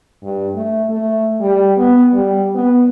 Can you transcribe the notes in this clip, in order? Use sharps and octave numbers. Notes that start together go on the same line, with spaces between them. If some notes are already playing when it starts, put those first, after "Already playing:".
G2
A3
A3
G3
B3
G3
B3